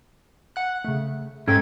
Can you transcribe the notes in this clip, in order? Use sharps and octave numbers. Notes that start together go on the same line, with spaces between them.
F#5 F#6
C#3 A3
G#2 C#4 A4 G5 G#6